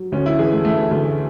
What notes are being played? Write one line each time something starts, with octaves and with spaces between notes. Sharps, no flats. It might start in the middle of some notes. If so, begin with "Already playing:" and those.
Already playing: F#3
D2 C#4
E4
E3 G#4
A3
E3 A3
D2 A3